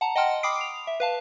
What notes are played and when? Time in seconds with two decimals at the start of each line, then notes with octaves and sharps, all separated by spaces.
0.01 F#5 A5 A#5
0.16 D#5 F#5 G5 A5 C6 F6
0.43 G5 B5 D6 D#6 C7 D7
0.61 F7
0.87 E5
1.00 B4 F5 A5